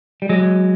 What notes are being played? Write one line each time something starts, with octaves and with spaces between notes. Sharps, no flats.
G3
F#3 G#3